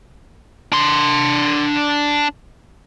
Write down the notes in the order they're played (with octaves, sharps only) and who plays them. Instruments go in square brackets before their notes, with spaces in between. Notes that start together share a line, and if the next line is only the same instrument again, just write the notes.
[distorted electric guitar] D4 C6